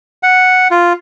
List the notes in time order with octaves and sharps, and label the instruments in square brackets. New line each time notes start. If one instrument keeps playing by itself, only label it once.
[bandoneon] F#5
F4